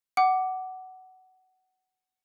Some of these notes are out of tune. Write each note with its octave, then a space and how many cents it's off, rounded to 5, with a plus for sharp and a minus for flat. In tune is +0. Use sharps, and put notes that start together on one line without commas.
F#5 +15 D6 +0